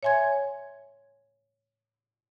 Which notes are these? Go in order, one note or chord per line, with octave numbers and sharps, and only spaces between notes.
C#5 E5 G#5 C6 G#6